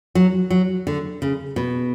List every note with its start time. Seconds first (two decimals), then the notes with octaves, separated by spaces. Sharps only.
0.15 F#3
0.50 F#3
0.87 D3
1.22 C#3
1.56 B2